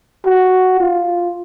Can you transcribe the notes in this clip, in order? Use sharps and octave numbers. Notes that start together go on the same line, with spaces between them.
F#4
F4